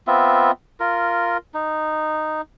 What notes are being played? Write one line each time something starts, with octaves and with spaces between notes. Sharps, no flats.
B3 C4 F4 E5
F4 A#4
D#4